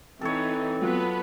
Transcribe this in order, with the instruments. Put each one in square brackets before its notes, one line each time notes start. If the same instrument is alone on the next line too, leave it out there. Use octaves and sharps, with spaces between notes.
[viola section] E3 D#4 [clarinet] C4 [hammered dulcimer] A4 C#5
[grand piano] F#3 F4 [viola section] B3 B4